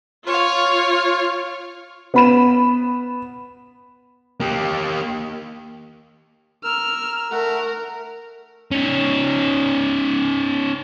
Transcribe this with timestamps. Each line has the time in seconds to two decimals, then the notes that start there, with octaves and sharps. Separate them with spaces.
0.25 F4 C#5 F5
2.14 B3 B5 E7
4.40 A#3 G4
6.64 A#4 E6 F6
7.32 A3 A#4 F#5
8.71 C#4 D#4